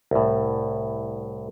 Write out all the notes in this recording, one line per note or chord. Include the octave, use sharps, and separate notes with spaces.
C2 A2